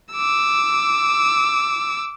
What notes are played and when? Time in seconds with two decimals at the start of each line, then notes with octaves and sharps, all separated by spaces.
0.13 D6 E6